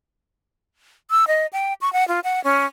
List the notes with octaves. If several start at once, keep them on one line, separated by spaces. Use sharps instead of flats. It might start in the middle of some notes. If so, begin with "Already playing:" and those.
E6
D#5
G5
C#6
F#5
F4
F#5
C#4